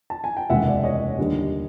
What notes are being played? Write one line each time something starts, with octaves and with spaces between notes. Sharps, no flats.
A5
G#5
G5
F1 D#2 C#3 E3 G#3 E5 F#5
D5 E5
C#5 D#5
D#2 D3 G3